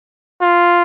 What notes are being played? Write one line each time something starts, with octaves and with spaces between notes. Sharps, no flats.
F4